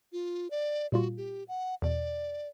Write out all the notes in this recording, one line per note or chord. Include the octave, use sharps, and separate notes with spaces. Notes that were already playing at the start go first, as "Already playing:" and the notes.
F4
D5
A#2 G3 F4 F#4
G4
F#5
E2 B2 D5